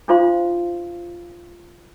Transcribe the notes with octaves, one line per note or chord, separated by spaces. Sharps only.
D4 D#4 F4 C5 F5 C6